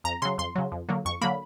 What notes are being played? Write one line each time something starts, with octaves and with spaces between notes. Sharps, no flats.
F2 A#5
C#3 F#3 C6
F2 C6
C#3 F#3
F2
D3 F#3 A#3
F2 C#6
D3 F#3 A#3 B5